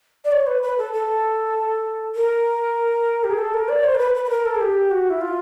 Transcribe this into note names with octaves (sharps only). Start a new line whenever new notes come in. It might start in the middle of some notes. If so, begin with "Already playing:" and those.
D5
C#5
B4
B4
A4
A4
A#4
G4
G#4
A4
A#4
D5
C5
A#4
B4
B4
B4
A#4
A4
G#4
G4
F#4
E4
F4